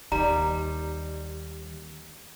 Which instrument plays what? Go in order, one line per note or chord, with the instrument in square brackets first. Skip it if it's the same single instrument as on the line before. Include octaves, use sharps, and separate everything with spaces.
[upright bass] D#2 D#3 [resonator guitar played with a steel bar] G3 [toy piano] A#5